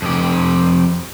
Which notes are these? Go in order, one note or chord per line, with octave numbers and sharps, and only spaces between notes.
F2 G4